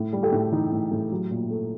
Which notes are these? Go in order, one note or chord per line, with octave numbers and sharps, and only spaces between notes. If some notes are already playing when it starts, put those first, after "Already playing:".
Already playing: A2
G3
G4 A4
A2
E3 D#4
A2
A2
F#3
A#2
A3